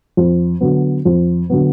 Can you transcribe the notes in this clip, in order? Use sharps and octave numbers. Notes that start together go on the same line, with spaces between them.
F2
D3 F#3 B3
F2
D3 F#3 B3